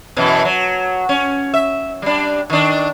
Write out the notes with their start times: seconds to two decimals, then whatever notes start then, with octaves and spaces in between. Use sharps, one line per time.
0.16 F#2 B2 E3
0.45 F#3
1.09 C#4
1.54 E5
2.02 G3 D4
2.50 D#3 D4